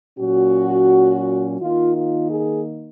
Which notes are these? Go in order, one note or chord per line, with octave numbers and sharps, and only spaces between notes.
A#2 F#3 C#4 F#4
D#3 A#3 D#4 F4
F4
G#4